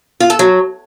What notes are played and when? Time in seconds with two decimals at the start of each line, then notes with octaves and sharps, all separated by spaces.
0.20 F4
0.30 A4
0.39 F#3